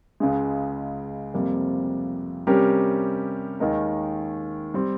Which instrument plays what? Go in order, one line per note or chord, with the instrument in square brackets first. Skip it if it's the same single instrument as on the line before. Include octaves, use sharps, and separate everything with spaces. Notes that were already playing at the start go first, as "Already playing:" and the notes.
[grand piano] C#2 C#3 G#3
F2 C3 G3 A#3
C3 G3 C#4 G4 A#4
D#2 D#3 G#3 D#4 A#4
G3 C4